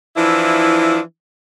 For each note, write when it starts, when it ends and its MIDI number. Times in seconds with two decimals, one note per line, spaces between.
0.16 0.99 52
0.16 0.99 53
0.16 0.99 62
0.16 0.99 64